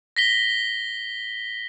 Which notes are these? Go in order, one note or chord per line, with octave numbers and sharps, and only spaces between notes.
A#6 B6 G7